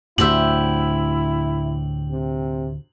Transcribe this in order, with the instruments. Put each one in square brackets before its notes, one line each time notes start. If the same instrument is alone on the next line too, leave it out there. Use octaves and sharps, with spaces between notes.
[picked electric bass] D2 A2 [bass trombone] E4 [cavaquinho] G4 C5 E5 [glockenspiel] F#7
[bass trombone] C3